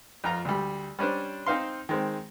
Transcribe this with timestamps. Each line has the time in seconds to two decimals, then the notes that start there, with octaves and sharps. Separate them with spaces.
0.24 F2 F4 A#5
0.45 D2 G3
0.99 G3 C#4 D4 C5
1.46 C4 D#4 C5 F5 C6
1.89 D#3 G#3 C4